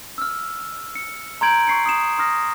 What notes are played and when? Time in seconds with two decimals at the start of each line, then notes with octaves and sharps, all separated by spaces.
0.18 E6 F6
0.95 C#7
1.41 A#5 C6 G6 G#6 D7 F#7
1.68 C#6 C7 C#7
1.86 D#6 C7 E7
2.18 C6 D#6 F6 A#6